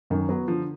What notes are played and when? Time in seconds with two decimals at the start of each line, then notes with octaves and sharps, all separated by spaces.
0.10 F#2 D#3
0.29 F#3 B3
0.48 D3 F3